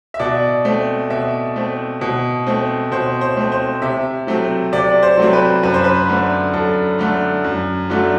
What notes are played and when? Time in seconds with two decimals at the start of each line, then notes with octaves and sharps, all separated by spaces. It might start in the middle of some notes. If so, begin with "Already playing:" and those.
0.14 E5
0.19 B2 D5
0.65 A3 C4
1.10 B2 E5
1.56 A3 C4
2.01 B2
2.47 A3 C4
2.91 B2 C5
3.21 C5
3.37 A3 C4
3.52 C5
3.82 C3 E5
4.27 F#3 A3 C4
4.73 C3 D5
5.03 C5
5.17 F#3 A3 C4
5.33 B4
5.63 F#2 B4
5.74 C5
5.84 B4
6.08 D3 A3 C5
6.53 F#2 A4
6.99 D3 A3
7.44 F#2
7.90 D3 F#3 A3